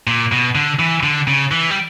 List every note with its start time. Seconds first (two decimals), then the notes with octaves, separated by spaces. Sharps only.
0.07 A#2
0.32 B2
0.55 D3
0.79 E3
1.03 D3
1.27 C#3
1.52 E3
1.70 G3